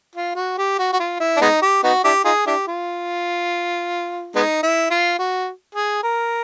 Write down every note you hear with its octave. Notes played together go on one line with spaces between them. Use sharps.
F4
F#4
G4
F#4
F#4
F4
E4
D4
G#3 B3 D#4
G4
B3 D#4 F#4
D4 E4 G4
D#4 F4 G#4
D4 E4 G4
F4
G#3 B3 D#4
E4
F4
F#4
G#4
A#4